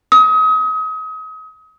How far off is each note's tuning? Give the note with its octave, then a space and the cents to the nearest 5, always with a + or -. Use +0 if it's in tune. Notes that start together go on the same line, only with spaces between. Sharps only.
D#6 +35